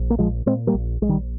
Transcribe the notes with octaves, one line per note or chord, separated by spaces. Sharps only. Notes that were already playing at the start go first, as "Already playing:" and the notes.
Already playing: A#1
A#3
A#2 F3 G#3
A#2 G#3 C4
G3 A#3
A#1
A#1 G#3
D#3 G3